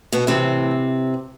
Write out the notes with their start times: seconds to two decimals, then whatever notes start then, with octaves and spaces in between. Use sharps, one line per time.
0.12 B2 B3
0.27 A2 C3 E3 C4